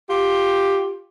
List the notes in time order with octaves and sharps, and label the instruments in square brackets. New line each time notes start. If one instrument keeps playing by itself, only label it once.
[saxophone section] F4 G4